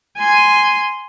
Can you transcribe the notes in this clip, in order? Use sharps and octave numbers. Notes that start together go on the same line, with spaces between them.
G#5 C6